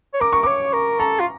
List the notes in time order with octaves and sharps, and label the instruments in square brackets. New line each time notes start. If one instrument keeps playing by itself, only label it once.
[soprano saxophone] C#5
[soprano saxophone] A#4 [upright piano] D6
[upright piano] C#6
[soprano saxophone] C#5 [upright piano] D6
[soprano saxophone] A#4
[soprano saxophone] A4 [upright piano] A#5
[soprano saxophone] F4